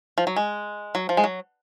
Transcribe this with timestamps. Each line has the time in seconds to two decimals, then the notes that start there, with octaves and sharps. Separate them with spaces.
0.18 F3
0.27 F#3
0.36 G#3
0.95 F#3
1.09 F3
1.17 G#3
1.24 F#3